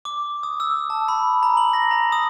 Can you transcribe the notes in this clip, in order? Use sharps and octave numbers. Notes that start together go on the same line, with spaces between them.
D6
D#6
E6
A5
B5
A#5
F#7
A#6
A#5
D#6